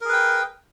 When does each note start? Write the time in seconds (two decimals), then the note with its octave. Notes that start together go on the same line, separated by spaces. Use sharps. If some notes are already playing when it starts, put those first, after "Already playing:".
0.01 A#4
0.05 G#4
0.09 B4
0.13 G5